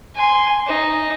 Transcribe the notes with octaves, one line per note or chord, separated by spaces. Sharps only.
G#5 C6
D#4